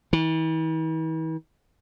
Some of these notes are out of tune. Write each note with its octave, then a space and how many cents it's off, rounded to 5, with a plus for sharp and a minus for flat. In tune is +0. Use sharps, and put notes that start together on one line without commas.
E3 -45